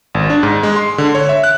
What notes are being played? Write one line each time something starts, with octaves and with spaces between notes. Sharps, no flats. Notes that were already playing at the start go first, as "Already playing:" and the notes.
G#1
D4
G#2
G#3
C6
D3
C#5
E5
F#6